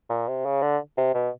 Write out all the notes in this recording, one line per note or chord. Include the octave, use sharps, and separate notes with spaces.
A#2
C3
C#3
D3
C3
B2